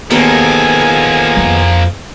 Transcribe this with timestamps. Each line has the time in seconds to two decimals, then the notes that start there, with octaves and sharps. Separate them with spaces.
0.11 D#2 F3 A#3 B3 G#4 A4 G#5
1.37 F2